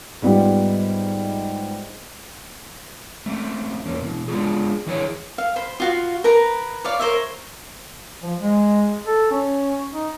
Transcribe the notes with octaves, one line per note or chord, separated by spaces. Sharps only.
G#2 G3 B3 F4 G4
A3 C4 C#4 E5
E2 A#3 C#4
B2 E3
G#3 B3 D4 D#4 F4 G#4
D#3 E3 E4 G#4 B4 C#5
F5
C5 B5
F4 F#4 F5
A#4 B4 A#5
C#5 D5 F5
A#4 C5 C#5 E5
F3
G#3
A4
C#4
D#4